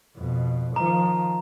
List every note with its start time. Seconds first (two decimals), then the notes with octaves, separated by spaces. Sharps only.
0.17 F2 B2
0.76 D#3 F3 A#5